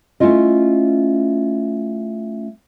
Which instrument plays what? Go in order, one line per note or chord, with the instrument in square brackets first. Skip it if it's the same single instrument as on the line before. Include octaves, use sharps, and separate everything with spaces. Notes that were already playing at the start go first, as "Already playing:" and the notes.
[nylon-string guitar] A3 C#4 E4 F4 D#5